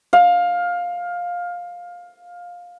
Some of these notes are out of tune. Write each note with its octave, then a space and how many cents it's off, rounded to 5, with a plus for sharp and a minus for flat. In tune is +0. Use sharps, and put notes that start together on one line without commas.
F5 +15